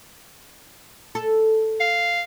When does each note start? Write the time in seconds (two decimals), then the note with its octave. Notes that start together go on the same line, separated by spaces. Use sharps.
1.15 A4
1.80 F5